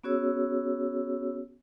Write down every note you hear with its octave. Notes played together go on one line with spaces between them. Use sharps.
B3 C#4 F#4 G#4 C#5 E6